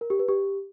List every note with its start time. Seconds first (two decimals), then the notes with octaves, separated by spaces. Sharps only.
0.01 A#4
0.10 G4
0.19 B4
0.28 G4